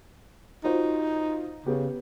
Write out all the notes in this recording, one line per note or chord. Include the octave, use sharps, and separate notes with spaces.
D#4 F4 F#4 C5
C#3 B3 G4